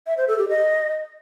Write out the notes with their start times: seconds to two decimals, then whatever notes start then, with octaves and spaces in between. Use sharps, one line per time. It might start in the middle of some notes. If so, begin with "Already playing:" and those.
0.07 E5
0.17 C5
0.28 A4
0.38 G4
0.49 D#5